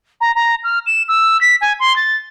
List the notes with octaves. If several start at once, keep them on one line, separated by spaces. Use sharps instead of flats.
A#5
A#5
F6
E7
E6
B6
G#5
C6
A6